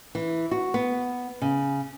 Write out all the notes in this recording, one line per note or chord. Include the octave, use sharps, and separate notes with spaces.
E3
F#4
B3
C#3